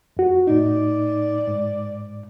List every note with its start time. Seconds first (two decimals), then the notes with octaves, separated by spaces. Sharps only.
0.17 F2 F#4
0.47 A2 D#4 D5
1.47 G#2